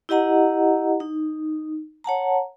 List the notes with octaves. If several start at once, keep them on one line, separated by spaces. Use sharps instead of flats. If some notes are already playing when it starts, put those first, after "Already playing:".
E4 G4 D#5 F#5 A#5
D#4
C#5 F#5 A5 A#5